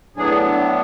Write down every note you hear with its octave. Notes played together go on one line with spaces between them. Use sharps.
A2 F#3 B3 D4 G#4